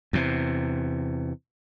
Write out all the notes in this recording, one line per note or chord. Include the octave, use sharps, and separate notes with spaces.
E2 C3